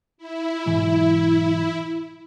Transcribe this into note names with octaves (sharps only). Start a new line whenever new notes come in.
E4
B1 G#2 E3